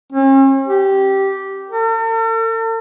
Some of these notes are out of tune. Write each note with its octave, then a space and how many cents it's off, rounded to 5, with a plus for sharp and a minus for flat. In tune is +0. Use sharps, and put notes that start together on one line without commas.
C#4 -45
G4 -10
A4 +45